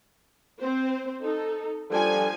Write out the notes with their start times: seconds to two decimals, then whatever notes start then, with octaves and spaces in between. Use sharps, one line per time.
0.60 C4 C5
1.23 D#4 A4
1.91 F3 G3 D4 A4 G#5